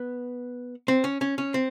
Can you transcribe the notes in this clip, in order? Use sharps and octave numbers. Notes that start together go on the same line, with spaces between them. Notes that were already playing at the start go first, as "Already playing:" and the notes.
Already playing: B3
C4
C#4
C#4
C#4
C4